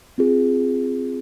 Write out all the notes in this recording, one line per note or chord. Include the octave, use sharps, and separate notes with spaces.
C4 F4 G#4